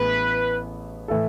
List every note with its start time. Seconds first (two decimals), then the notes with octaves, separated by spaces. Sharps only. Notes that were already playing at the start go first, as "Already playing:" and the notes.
Already playing: A1 A2 E3 G#3 B3 B4
1.08 A2 E3 A3 E4 A4